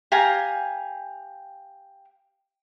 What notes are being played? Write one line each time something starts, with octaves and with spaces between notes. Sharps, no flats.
G4 F5 G#5 A#5